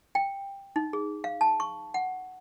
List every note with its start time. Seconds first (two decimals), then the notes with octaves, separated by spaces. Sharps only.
0.15 G5
0.76 D#4
0.93 G#4
1.24 F5
1.41 A5
1.60 C#6
1.94 F#5